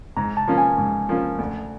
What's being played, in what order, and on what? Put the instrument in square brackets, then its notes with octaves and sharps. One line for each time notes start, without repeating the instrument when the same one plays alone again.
[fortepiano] G#2 [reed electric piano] A#5
[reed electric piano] A5
[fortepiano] F3 A#3 C#4
[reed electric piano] G#5
[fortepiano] G#2
F3 A#3 C#4
D2